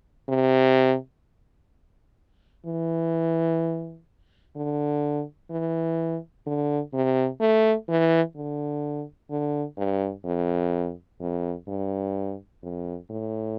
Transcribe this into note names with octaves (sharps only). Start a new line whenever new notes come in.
C3
E3
D3
E3
D3
C3
A3
E3
D3
D3
G2
F2
F2
G2
F2
A2